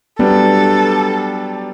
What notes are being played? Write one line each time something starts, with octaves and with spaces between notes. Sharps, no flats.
F#3 G3 B3 D4 A4